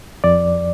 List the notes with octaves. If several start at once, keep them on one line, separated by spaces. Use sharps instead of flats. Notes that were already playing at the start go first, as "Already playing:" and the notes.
F2 D5